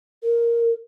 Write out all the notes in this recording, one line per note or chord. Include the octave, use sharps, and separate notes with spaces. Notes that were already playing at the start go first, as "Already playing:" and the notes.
A#4